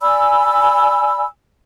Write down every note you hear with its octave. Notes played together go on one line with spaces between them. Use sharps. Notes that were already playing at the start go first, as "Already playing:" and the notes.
D5 G#5 B5 E6